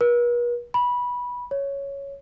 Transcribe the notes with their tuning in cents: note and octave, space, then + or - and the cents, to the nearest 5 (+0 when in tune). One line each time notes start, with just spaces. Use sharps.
B4 -45
B5 -15
C#5 +5